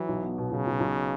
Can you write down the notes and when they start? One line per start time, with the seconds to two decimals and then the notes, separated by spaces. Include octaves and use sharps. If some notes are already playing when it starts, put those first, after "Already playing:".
Already playing: E3 F#3
0.08 B1
0.23 B3
0.38 B2
0.51 B1 C#3
0.67 B1
0.80 B1